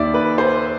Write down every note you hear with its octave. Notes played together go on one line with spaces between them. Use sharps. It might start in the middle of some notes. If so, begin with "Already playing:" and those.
Already playing: D#2 D#3 D5 E5
B4
C5